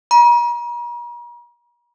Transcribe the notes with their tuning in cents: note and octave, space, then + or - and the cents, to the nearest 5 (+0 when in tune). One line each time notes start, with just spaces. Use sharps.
A#5 +40